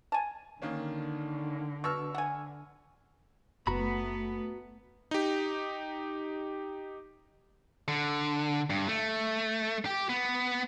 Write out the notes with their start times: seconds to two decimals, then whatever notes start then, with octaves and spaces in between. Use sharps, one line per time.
0.12 G#5 A5
0.62 D3 D#3 A#3 C#4
1.84 B2 C#6 E6 F6
2.15 F#5 G#5
3.67 F#1 A3 B3 F#4 A#5 B5
5.11 D#4 G4
7.88 D3
8.70 G2
8.88 A3
9.86 G4
10.09 B3